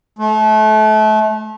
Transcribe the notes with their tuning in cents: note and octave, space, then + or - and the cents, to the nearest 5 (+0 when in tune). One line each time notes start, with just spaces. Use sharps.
A3 -30